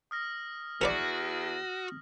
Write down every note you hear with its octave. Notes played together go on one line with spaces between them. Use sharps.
D#6 F6 A#6
E2 F#4 A#4 B4 D5